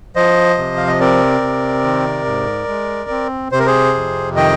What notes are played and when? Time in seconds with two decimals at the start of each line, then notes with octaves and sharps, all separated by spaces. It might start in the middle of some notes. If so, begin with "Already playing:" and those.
0.16 F3 C5 D#5
0.57 C3
0.77 F5
0.87 D#5
1.00 C4 A#4 D5
1.41 C3
1.84 D#3
2.26 G#2
2.68 G#3
3.10 C4
3.52 C3 C5
3.59 A#4
3.66 G#4 C5
3.94 F2
4.36 D#3 D#5 G5